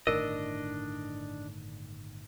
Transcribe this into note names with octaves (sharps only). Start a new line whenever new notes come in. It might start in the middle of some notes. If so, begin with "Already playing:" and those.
G1 A2 D#3 D4 A#4 D#5